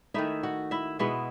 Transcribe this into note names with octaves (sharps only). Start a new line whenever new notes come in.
D#3 A3 D#4 E4 E5
F#4 F#5
E4 E5
B2 G#3 B3 E4 E5